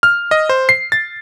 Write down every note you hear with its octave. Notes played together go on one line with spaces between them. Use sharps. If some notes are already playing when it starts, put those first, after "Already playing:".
F6
D#5
C5
C7
A6